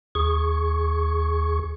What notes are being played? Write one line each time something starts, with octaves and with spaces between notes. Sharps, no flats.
D#2 G#4 C#6